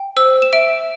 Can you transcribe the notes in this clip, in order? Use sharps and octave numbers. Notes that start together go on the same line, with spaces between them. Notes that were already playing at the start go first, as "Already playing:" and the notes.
Already playing: G5
C5 E6
E7
E5 D7